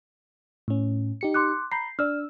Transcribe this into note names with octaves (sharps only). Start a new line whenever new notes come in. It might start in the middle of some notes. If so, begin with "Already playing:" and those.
A2 C#4
D#4 G4 C#7
C6 D6 F#6
A#5 B5 G6 C7
D4 D5 E6 F6